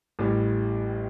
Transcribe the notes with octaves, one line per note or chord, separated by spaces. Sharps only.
A1 A2 G3